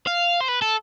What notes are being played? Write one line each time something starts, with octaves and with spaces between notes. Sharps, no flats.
F5
C5
B4
A4